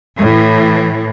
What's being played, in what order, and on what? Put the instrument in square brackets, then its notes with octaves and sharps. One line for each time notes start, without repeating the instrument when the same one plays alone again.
[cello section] A2 E3